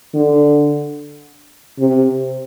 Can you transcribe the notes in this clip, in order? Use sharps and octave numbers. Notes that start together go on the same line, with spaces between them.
D3
C3